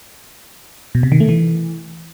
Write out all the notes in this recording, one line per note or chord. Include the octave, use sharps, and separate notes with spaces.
B2
C3
D#3
A3
E3